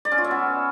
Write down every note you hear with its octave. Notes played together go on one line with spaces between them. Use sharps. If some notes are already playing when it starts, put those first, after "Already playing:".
D5
C#4
F4
E5
B3